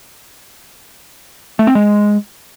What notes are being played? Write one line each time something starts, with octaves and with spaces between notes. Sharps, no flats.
A3
C4
G#3